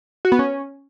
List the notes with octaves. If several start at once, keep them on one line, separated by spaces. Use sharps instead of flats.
F#4
B3
C#4